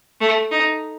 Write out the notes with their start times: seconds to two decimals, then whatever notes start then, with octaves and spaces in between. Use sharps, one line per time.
0.21 A3
0.52 D#4